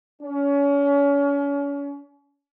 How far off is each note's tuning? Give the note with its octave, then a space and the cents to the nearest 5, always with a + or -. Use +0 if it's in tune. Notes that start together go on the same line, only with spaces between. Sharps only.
C#4 +35